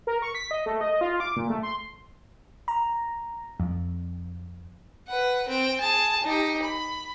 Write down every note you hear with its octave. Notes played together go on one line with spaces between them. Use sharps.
A#4
C#6
B6
D#5
A3
D#5
F4
D6
A#2
A3
C6
A#5
F2
B4 F#5
C4 G5
G#4 A5
D#4 G4
B5